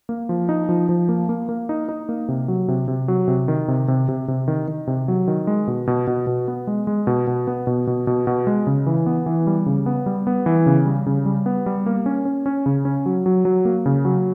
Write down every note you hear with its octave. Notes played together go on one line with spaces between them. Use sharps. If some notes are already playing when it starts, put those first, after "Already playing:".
A#3
F3
D#4
F3
F3
A#3
A#3
A#3
D#4
D#4
A#3
C3
F#3
C3
C3
F#3
C3
D#3
C3
C3
C3
C3
D#3
D#3
C3
F#3
D#3
G#3
B2
B2
B2
B2
B3
G#3
G#3
B2
B2
B3
B2
B2
B2
B2
G#3
C#3
E3
B3
E3
G3
C#3
B3
G3
B3
E3
C#3
G3
C#3
G3
B3
G3
A#3
C#4
C#4
C#4
C#3
C#4
F#3
F#3
F#3
A#3
C#3
F#3